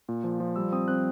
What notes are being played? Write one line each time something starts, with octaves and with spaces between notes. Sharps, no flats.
A#2
F3
F3
G3 E6
C4 D#6
C4 F#6